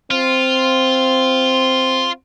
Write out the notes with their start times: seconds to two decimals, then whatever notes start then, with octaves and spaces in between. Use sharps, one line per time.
0.11 C4 F4